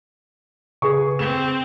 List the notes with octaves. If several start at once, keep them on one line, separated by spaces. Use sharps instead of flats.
C#3 G#4 B4 C#6
C4 E7